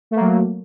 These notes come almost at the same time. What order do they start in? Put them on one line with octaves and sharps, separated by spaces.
A3 A#3 F#3